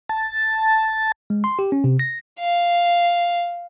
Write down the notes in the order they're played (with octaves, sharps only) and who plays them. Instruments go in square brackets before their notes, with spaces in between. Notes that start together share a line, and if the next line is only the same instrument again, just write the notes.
[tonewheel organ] A5
[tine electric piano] G#3
C6
G4
C#4
C3
A#6
[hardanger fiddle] F5